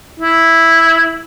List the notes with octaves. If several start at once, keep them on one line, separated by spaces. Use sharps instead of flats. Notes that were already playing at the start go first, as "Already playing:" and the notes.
E4